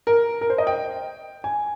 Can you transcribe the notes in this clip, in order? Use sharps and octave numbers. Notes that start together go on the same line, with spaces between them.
A#4
A#4
C5
D#5
G5
G#5